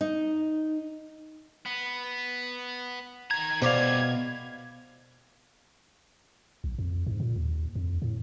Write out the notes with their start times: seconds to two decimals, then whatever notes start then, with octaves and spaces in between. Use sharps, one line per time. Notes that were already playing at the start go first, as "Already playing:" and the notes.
0.01 D#4
1.66 B3
3.31 D#3 A#5 G#6
3.62 B2 G3 A4 C5 D5 F5
6.64 B1
6.79 F2
7.06 G#2
7.20 A#2
7.36 D#2
7.75 F2
8.02 A2